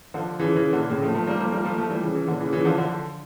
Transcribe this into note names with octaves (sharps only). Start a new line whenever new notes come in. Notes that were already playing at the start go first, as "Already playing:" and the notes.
D3 F3
C#3 E3
C#3 E3
A#2 D3
A2 C#3
F3 A3
F3 A3
G3 A#3
F3 A3
G3 A#3
F3 A3
F3 A3
E3 G3
C#3 E3
C#3 E3
A#2 D3
C#3 E3
C#3 E3
D3 F3
D3 F3